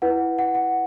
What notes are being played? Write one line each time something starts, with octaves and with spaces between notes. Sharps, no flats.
E4 B4 F#5
F#5
F#5